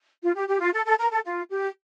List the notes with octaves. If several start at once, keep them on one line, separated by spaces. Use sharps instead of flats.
F4
G4
G4
F4
A4
A4
A#4
A4
F4
G4